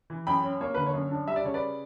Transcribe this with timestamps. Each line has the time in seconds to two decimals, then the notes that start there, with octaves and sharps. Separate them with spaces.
0.10 E3
0.27 F#2 G5 B5
0.44 C#4
0.61 A#3 C#5
0.74 D3 B4
0.86 C#5
0.94 F#2
1.11 D4
1.27 G3 E5
1.36 D5
1.44 C#3 C#5
1.54 B4 D5